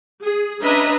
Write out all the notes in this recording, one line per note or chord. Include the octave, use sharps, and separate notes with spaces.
G#4
C#4 D4 B4 D#5 E5 A#5